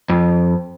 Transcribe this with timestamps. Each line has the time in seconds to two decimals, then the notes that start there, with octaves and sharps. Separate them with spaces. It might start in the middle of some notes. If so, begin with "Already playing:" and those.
0.09 F2